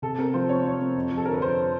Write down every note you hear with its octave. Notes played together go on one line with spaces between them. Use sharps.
C3 A4
C4 A#4
F3 C5
C4 C#5
F3 C#5
C4
F2
F2
A4
D3 A#4
B4
F2 C5